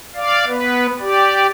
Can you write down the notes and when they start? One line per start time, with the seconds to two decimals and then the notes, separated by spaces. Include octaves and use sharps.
0.15 D5 F5
0.47 B3 B4
0.99 G4 D5